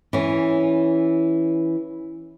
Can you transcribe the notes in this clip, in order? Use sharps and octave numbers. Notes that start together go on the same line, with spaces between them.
E3 C#4